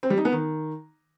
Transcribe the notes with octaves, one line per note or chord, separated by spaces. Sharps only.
C4
G3
D#4
B3
D#3